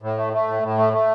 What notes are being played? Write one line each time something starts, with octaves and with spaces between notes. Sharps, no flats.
A2
A3
A3
A2
A2
A3
A3